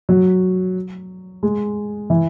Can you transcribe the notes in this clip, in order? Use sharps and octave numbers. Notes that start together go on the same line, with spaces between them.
F#3
G#3
E3